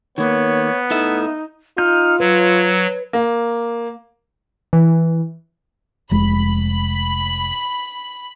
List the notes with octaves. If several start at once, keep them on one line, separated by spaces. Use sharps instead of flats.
D#3 A#3 B3 C#5
A2 D#4 A4 E5
D#4 F4 F6 G6
F#3 B4 C#5
A#3
E3
F1 G#3 B5